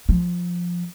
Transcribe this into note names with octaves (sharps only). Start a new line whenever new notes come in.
F3